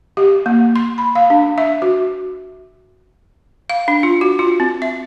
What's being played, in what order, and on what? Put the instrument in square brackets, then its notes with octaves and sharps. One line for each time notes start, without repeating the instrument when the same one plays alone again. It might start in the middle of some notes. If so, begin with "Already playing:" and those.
[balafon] G4
A#3
C6
B5
F5
D4
E5
F#4
F5
D4
F4
F#4
F4
C4
E5